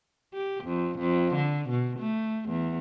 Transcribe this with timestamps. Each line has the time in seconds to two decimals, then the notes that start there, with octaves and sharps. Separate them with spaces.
0.33 G4
0.64 F2
0.99 F2
1.35 D3
1.69 B2
1.99 A3
2.49 E2